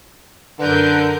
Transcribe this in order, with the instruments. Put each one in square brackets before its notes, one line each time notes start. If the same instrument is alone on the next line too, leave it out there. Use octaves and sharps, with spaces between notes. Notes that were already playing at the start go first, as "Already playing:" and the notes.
[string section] F#2 A#4 G6 [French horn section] D3 [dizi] B4